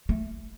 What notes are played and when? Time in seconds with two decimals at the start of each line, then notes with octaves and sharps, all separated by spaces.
0.09 A3